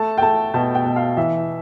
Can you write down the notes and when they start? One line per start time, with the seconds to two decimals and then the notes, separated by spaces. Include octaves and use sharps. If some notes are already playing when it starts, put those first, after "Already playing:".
Already playing: A3 A5
0.18 G5
0.21 A3 A5
0.54 B2 A5
0.75 G5
0.85 B2
0.96 F5
1.17 E3 E5